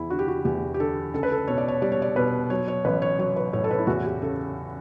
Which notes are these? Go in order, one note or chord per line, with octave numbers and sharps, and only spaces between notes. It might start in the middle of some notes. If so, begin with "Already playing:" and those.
Already playing: E2 E4
D3 F#4
G4
F#4
E2 G4
G4
D3 A4
C#2 A4
B4
A4
B2 C#5
D5
C#5
G3 D5
C#5
D5
B2 B4
F#3 C#5
C#5
A1 B4
C#5
F#3 C#5
B4
A2 C#5
A4
B4
E4
E2 F#4
G4
C#3 A4